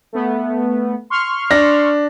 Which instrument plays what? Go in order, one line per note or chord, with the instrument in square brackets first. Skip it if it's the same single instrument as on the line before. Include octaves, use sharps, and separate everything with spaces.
[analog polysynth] A3 B3
C6 C#6 F6
[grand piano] D4 A#6